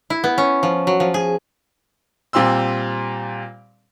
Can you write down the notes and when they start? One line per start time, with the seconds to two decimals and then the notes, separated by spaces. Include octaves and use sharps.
0.10 E4
0.24 B3
0.38 C#4
0.63 F3
0.87 F#3
1.00 F3
1.14 G#4
2.33 A#2 G3 C4 C6 E6